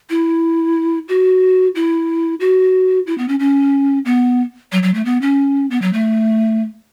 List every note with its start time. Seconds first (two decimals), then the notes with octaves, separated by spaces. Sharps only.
0.10 E4
1.09 F#4
1.75 E4
2.40 F#4
3.07 E4
3.18 B3
3.28 C#4
3.39 C#4
4.05 B3
4.72 F#3
4.83 F#3
4.94 A3
5.05 B3
5.22 C#4
5.71 B3
5.82 F#3
5.93 A3